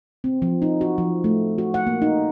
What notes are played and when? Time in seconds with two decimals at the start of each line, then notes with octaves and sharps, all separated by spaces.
0.24 C4
0.42 F3
0.62 D#4
0.81 F#4
0.98 F3
1.24 A3
1.58 F#4
1.74 F#5
1.87 A#3
2.02 D#4